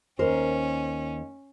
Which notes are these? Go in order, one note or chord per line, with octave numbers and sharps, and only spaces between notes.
D#2 C#4 A#4 C5